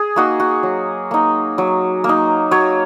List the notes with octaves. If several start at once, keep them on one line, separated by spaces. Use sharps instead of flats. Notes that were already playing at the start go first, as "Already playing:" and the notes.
Already playing: G#4
A#3 D#4 F#4
F#4
F#3
A#3 D#4
F#3
A#3
D#4
F#3 C#5